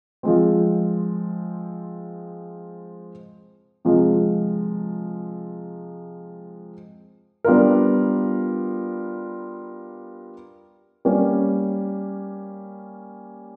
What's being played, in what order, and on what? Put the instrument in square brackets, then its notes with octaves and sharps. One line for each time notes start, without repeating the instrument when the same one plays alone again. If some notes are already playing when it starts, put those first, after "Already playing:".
[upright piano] F3 G#3 C4
C3 F3 G#3
G3 B3 D4 F4 A#4
G3 A#3 C#4